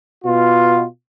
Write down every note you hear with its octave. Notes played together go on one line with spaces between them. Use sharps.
B2 F4